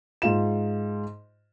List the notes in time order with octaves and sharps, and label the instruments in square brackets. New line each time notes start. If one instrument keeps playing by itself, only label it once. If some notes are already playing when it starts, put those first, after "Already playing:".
[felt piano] G#2 F4 E7